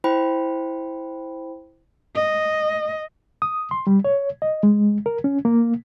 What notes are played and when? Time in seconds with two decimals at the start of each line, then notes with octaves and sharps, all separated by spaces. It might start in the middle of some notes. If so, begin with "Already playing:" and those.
0.04 E4 C5 G5 B5
2.15 D#5
3.42 D#6
3.71 C6
3.87 G3
4.05 C#5
4.42 D#5
4.63 G#3
5.06 A#4
5.24 C#4
5.45 A#3